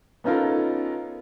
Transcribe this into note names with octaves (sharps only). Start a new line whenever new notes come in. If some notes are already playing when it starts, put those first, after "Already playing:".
B3 C#4 D#4 F4 A4 A#4